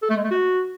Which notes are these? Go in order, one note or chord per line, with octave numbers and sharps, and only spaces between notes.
A4
A3
G#3
A3
F#4